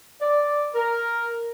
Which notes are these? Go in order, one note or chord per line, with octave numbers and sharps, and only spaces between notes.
D5
A#4